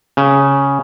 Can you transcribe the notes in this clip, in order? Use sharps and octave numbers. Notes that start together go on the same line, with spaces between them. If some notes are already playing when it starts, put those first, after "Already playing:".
C#3